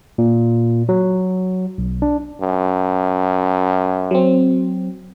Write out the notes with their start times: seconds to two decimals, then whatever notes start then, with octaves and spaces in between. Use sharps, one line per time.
0.18 A#2
0.89 F#3
1.78 B1
2.02 D4
2.41 F#2
4.11 F#3 C4